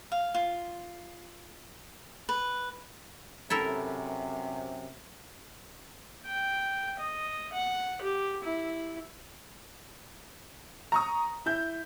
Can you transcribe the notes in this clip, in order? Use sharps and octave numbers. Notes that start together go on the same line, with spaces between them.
F5
F4
B4
F#2 C3 E4 A4 A#4
G5
D#5
F#5
G4
E4
A#5 C#6 D#6
E4 G6